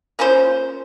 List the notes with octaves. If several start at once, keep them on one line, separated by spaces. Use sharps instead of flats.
A#3 C#4 F4 C5